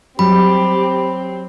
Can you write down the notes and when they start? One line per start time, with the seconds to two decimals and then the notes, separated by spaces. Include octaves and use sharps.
0.19 F#3 G3 C4 G4 B5